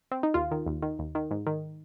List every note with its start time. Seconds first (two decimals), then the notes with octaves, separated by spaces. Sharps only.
0.12 C4
0.23 D#4
0.34 D#2 F4
0.51 D#3
0.67 D#2
0.82 D#3
0.99 D#2
1.15 D#3
1.31 G#2
1.47 D#3